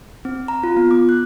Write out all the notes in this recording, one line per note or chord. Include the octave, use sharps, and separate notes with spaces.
C4
A#5
F4
B3
D6
F#6